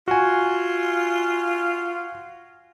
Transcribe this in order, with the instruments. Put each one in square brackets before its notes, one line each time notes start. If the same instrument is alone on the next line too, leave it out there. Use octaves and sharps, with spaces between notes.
[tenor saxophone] F4 [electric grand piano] F#4 G#5